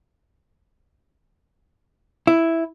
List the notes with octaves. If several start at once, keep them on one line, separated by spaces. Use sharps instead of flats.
E4